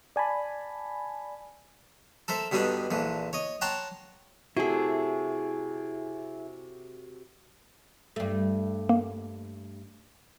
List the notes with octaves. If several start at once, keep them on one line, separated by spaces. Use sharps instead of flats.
D5 G#5 A5 B5
A4 A#4 C5 E5
G2 B2 D3 G3 D4 D#4
A#1 D3 E3
C#5 D#5
C#5 F#5 G5 A5 A#5 C6
C3 A3 E4 F#4 G#4
G2 A3
A#3